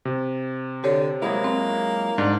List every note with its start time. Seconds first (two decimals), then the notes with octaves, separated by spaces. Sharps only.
0.05 C3
0.84 D3 G4 C#5
1.22 F#3 G#3 A#3 E4
1.44 C4
2.18 G#2 D4